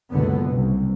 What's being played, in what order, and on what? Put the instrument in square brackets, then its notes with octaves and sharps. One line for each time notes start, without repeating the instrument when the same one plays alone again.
[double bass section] F#1 C#2 B2 D3 B3
C2